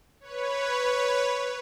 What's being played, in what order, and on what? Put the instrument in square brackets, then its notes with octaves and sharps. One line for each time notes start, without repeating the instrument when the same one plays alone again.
[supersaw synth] B4 C#5